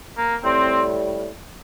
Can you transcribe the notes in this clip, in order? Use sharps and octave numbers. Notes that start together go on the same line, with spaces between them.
A#3
A2 G3 C4